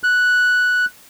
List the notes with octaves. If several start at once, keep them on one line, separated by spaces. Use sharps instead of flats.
F#6